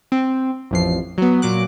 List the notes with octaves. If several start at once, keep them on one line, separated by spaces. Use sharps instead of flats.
C4
A1 F2 C7
F#3 B3
A#2 F#3 D6 F#6